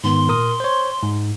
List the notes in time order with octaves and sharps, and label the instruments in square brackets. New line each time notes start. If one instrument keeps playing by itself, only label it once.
[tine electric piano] G#2 D#3 B3 [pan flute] C6
[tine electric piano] A#2 A#4 D#6
C5 C#5
G#2